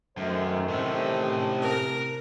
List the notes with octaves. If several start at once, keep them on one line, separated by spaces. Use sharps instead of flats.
F#2 D#3 A3 C5
A2 C3 C#4
A#4